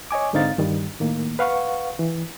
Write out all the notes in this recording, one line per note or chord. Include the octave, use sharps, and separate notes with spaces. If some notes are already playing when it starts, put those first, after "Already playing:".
C#5 D#5 G#5 D6
G#2 D3 C4 D#4 F5 A6
G2 D#3 G3
A2 D#3 A#3
B4 F5 F#5 C#6
E3